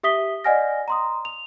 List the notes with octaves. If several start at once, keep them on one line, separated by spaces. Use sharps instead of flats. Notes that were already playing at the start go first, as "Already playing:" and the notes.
G4 E5 D#6 B6 G7
D5 D#5 F#5 G#5 F6 A#6
A#5 C6 D#6
F7